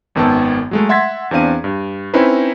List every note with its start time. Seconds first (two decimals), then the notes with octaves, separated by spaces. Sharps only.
0.15 G#1 F#2 D#3 B3 A5 E6
0.71 F#3 G#3 A3
0.89 E5 F#5 C6 G#6 A6 B6
1.31 E2 C4 D4 F5 D#7
1.64 G2
2.13 C4 C#4 D#4 E4 B4 C5